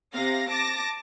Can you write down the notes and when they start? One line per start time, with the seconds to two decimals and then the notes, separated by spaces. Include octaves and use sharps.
0.14 C3 F5 A#6
0.50 A5 D6 A#6